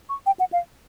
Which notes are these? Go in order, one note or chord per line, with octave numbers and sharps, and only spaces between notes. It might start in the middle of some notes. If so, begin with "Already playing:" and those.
C#6
G5
F#5
F5